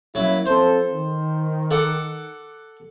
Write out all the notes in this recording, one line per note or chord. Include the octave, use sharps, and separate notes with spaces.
F#3 A#3 C#4 E4
F3 C4 A4 C5
D#3
A4 F#5 D6